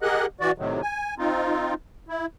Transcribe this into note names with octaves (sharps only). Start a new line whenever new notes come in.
G4 G#4 A#4 D#5 F#5 F#6
E3 F#4 D5
A2 C3 D#3 F#3
G#5
C4 D#4 F4
E4